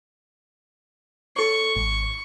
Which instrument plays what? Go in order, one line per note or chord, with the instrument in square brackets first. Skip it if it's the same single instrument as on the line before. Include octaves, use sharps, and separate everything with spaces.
[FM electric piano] A4 C#5 [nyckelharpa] C#6
[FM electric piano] G#1